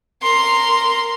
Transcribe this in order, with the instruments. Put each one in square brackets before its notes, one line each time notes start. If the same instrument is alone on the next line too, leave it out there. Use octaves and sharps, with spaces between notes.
[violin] A#4 C6